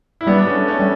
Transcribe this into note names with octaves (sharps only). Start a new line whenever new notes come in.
E4
G3 B3 D4
D4
A3 C#4
A3 C#4
G3